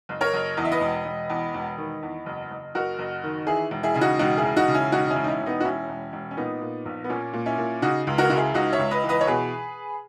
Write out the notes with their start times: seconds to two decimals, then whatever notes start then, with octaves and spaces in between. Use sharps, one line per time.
0.09 F#1
0.21 A#4 C#5
0.33 F#1
0.57 E2 D#5
0.65 E5
0.72 B4 D#5
0.81 E1
1.05 E1
1.30 E2
1.54 E1
1.78 D#3
2.03 E2
2.26 F#1
2.51 F#1
2.75 F#1 F#4 A#4
2.99 F#1
3.24 D#3
3.47 E3 E4 G#4
3.71 E1
3.83 E4 G#4
3.94 C#3 E4
4.01 D#4 F#4
4.19 E1 D#4 F#4
4.37 E4 G#4
4.43 E1
4.56 D#4 F#4
4.68 C#3
4.74 C#4 E4
4.92 E1 D#4 F#4
5.05 D#4
5.10 C#4 E4
5.16 E1
5.24 D#4
5.28 C#4 E4
5.41 E1
5.46 B3 D#4
5.60 F#4
5.65 E1 C#4 E4
5.89 E1
6.13 E1
6.31 C#4
6.37 A#2 B3 D#4
6.61 A#2
6.85 A#1
7.04 B3
7.09 A#2 A#3 C#4
7.33 A#2
7.46 C#4 E4
7.58 A#2
7.82 C#3 D#4 F#4
8.07 C#2
8.18 F#4 A#4
8.30 C#3 F#4
8.37 E4 G#4
8.54 C#2 D#4 F#4
8.72 C#5 E5
8.79 C#2
8.91 B4 D#5
9.03 E3
9.09 B4 D#5
9.21 C#5
9.27 B2 G#4 B4